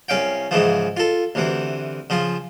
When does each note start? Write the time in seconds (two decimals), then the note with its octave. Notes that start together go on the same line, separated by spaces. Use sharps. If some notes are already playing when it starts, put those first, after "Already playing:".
0.09 C2 C#4 F5 G5
0.51 G#2 C#3 E3 F3
0.97 F4 A4
1.35 D2 C3 E3
2.10 C#3 F3 F4